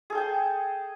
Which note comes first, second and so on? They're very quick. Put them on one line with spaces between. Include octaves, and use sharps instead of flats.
G#4 A4 G5 A5